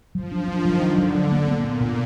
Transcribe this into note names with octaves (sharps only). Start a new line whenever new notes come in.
F3 F#3
D4
D#3 D4
F#3
D3 D4
F#3
D4
A#3
A#2 B3
B3
B2